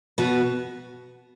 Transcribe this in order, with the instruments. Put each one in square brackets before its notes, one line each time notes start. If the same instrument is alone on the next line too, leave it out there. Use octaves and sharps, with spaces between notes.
[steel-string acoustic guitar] B2 B3 F#4 B4